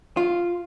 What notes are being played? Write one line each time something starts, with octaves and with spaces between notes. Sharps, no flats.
F4